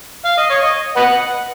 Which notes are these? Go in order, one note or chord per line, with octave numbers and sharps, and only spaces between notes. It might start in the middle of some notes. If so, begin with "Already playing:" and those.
F5
D#5
C#5
D#5
B4 D#5 F#5